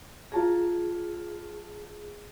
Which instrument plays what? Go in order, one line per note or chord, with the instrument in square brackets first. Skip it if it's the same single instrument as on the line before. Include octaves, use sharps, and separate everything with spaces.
[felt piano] F4 A5 A#5 [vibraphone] G#4